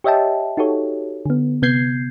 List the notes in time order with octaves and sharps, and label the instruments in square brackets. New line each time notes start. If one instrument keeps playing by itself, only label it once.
[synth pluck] G4 C#5 D#5 E5 G5 A5
D#4 F#4 G4 A4 C#5
D3 B3
C3 B3 G6 G#6 C7